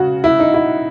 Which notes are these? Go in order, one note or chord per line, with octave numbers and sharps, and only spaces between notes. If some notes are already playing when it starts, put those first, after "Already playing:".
Already playing: C#3 F#4
E4
D#4
E4